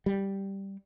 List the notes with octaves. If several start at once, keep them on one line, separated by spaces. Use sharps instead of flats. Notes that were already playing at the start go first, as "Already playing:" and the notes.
G3